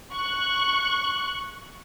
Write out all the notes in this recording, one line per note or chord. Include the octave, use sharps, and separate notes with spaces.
C#6 F#6